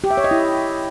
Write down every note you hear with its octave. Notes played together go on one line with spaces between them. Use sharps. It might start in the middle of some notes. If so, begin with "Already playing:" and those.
G4
E5
C#5
D#5
E4